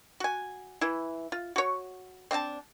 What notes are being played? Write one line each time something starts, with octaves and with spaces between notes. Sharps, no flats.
F#4 G#5
E3 E4
F4
F#4 C#5
C4 D4 F5 A5